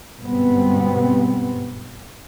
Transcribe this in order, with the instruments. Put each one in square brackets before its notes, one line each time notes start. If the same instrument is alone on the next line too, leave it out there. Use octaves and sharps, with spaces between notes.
[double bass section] G1 G#2 B2 G3 B3 C4